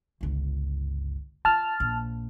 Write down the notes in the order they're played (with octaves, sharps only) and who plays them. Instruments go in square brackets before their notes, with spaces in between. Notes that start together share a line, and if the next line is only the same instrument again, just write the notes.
[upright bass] G1 C#2
[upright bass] F4 [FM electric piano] A5 F6
[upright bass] A#1